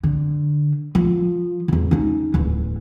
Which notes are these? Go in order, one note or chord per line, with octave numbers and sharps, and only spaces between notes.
D3
F3
E2 D3
C#4 D#4
D1 E2